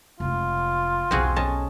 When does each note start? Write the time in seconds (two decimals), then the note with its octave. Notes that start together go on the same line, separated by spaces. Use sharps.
0.20 F1 G#3 F4
1.11 B1 E2 C4 F#4 G#4
1.36 C#4 D#5 A5